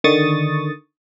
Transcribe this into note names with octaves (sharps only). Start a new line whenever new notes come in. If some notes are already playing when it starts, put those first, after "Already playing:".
D3 D#3 C#6 D#6 A6